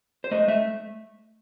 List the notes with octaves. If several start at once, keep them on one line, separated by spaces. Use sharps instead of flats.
C5
A3 D#5
A3 E5